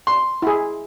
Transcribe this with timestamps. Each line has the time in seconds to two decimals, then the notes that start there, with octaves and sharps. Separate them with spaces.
0.07 C6
0.42 E4 G#4